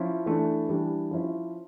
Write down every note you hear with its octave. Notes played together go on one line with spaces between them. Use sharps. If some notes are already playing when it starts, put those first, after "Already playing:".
Already playing: F3 C#4 E4
E3 A3 D4
E3 G3 D4
F3 C#4 E4